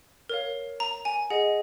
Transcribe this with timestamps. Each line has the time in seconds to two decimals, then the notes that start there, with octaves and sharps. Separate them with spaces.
0.29 A#4 C#5 F5
0.80 A#5
1.05 G#5
1.30 G#4 D#5 F#5